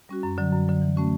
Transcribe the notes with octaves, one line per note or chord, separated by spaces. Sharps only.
G3 C#4 F#4
F#2
D3 F#3
F#2
D3 F#3
E3
A3 C#4 F#4